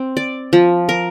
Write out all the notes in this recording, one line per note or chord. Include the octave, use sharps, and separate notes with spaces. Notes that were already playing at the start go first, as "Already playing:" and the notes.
Already playing: C4
D5
F3
A#4